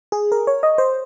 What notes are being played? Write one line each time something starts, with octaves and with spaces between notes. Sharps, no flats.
G#4
A#4
C#5
D#5
C5